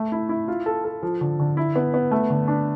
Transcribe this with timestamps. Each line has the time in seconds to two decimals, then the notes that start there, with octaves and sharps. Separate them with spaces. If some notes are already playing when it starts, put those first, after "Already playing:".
Already playing: A3
0.12 E4
0.29 E4
0.48 F4
0.66 A4
0.84 A4
1.03 F3
1.21 D3
1.39 D3
1.57 E4
1.76 B3
1.94 B3
2.11 A3
2.30 D3
2.48 D4